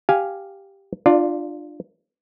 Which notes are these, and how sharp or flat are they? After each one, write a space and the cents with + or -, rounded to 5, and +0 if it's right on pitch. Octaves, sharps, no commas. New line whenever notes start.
G4 +0 F5 +0 G#5 +0
D4 +25 F4 +0 D5 +0